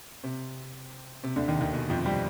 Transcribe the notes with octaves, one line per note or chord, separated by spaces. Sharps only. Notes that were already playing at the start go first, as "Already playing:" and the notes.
C3
C3
D2 D3
D#2 D#3
D#2 D#3
B2
F2 F3
G3